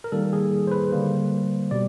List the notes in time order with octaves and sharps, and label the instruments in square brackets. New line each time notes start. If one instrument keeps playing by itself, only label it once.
[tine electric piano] A#4
D#3 G3 A#3 A4
G#4
C5
B4
D3 G3 A#3 C5
B2 G3 D5